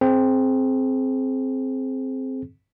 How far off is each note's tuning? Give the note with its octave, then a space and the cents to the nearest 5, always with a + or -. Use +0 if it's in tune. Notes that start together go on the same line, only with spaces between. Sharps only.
C4 +0 G#4 +30